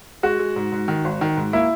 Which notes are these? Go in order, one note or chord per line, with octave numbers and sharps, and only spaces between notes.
G#3 F#4
G#3
G#2
G#2
D#3
G#1
D#3
G#2
A#3 E4